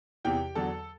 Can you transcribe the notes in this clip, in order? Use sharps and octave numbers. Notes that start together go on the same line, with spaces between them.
E2 C3 E3 G4 G5
E2 D3 F#3 A4 A5